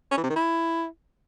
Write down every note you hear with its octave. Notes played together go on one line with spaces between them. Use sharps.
C#4
E3
C3
D#3
E4